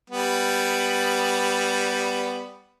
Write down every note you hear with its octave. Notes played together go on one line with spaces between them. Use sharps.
G3 B3